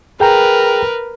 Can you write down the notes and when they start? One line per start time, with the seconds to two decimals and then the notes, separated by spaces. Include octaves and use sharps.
0.20 G#4 A#4 B4 G5 A#5